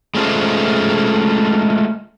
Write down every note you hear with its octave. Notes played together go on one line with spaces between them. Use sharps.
G#3 A3 C#4 F4 C5